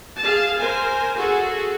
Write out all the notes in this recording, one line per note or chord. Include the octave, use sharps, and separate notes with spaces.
G#4 F5 A5
A#4 C5 G#5
F#4 G#4 A4